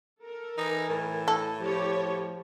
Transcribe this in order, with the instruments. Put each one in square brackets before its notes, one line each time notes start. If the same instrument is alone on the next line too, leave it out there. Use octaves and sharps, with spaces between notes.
[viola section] A4 A#4
[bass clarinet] E3 [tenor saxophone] D#4
[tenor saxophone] A2
[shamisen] A4
[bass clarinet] F3 [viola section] G4 C#5